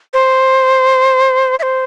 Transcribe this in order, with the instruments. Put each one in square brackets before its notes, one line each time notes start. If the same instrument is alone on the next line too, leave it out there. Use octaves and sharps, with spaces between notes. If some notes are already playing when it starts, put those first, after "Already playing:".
[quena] C5
E5
C5